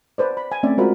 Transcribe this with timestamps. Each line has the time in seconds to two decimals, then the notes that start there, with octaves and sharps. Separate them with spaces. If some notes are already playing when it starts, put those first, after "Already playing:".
0.18 B4 C5 D5
0.37 B5
0.52 G#5
0.63 A3 C4 C#4 D5 E5
0.78 G#3 F4 F#4 A#4 C5 B5